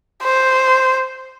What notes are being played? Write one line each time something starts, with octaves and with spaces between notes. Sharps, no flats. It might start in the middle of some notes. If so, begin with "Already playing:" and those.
C5